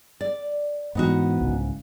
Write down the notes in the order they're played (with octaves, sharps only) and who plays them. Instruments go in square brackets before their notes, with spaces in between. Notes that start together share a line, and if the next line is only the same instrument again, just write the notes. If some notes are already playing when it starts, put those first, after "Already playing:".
[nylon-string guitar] D5
[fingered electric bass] G#2 E3 [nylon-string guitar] B3 D#4 F#4
[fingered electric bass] C2 G#2 C#3